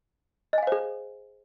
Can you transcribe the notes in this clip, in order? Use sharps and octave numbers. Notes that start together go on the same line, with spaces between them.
G#4 C5 D#5 F5 G#5